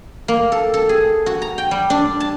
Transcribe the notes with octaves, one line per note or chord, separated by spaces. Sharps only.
A#3
A4
A4
G#4
F#4
A#5
G5
G3
D4
A5